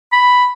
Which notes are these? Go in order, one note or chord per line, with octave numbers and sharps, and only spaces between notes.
B5